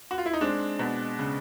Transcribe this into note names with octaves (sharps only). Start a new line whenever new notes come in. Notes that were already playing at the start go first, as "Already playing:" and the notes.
F#4
F4
E4
D#4
G#3 C4 D4
B2
C#3